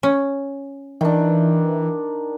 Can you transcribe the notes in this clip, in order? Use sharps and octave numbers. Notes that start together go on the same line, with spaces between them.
C#4
D#3 E3 D4